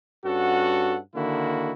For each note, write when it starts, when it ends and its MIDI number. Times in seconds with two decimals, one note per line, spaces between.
0.24 0.99 43
0.24 0.99 61
0.24 0.99 66
0.24 0.99 69
0.24 0.99 78
1.15 1.72 50
1.15 1.72 51
1.15 1.72 58
1.15 1.72 64
1.15 1.72 66